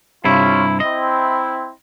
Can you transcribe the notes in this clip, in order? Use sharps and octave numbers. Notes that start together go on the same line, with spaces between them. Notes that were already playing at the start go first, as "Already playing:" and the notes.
G2 C3 E4 F4 C#5
C4 E4 D#5